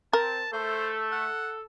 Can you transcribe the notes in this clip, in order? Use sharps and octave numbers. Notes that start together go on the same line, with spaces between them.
C4 A#4 A5
A3 A4 C5
F#5